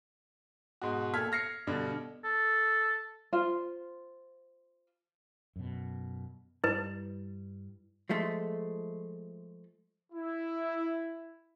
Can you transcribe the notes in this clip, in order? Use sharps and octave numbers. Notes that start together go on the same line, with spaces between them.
G#2 B2 F#4
A#2 A4 F6 G#6 B6
F6 A#6 C7 C#7
G2 B2 D3
A4
F4 C5
F#2 B2
G2 G3 E4 B4
F3 G#3 A3 A4
E4